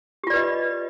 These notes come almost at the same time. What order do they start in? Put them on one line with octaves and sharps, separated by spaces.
G4 F4 D5 B4 D#5